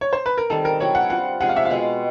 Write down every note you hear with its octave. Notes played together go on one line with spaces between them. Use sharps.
C#5
C5
B4
A#4
D#3 G3 C4 A4
A#4
F#3 B3 E4 C#5
F#5
G3 C4 F4 F#5
C3 F3 G#3 F#5
F5
E5
F5
B2 G#3 C4